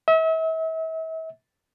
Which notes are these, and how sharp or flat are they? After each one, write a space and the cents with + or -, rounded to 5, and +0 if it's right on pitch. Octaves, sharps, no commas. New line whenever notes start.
E5 -40